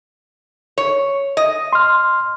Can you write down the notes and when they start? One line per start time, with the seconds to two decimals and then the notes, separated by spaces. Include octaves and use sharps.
0.78 C#5
1.37 D#5
1.73 C6 F6